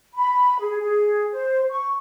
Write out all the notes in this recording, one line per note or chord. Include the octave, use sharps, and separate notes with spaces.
B5
G#4
G#4
C5
C#6